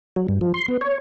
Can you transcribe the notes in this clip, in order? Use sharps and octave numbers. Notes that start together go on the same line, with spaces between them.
F#3
G2
F3
C6
B3
C#5